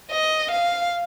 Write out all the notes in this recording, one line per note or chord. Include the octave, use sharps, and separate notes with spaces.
D#5
F5